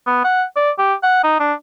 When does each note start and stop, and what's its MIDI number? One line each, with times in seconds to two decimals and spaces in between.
0.06 0.22 59
0.24 0.44 78
0.56 0.71 74
0.78 0.94 67
1.03 1.22 78
1.24 1.39 63
1.40 1.53 62